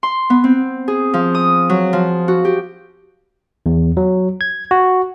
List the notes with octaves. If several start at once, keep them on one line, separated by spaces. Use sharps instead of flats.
C6
B3
C4
G#4
F3
D#6
F#3
F3
F#4
G4
E2
F#3
G#6
F#4